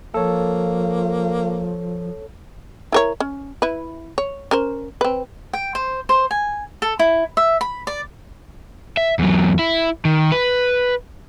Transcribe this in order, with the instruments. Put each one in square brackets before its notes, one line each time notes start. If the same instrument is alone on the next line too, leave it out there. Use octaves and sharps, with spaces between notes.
[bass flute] F3 [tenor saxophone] A#3 [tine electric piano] A4 C#5
[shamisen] E4 A#4 C#5
C#4
E4 B4
C#5
C#4 A#4 C5
C4 B4
[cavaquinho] G5
C5
C5
G#5
A4
E4
E5
B5
D5
[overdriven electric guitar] E5
E2 F#3
E4
D#3
B4